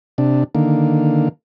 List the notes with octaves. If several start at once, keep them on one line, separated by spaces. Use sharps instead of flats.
C3 D4
D3 D#3 A#3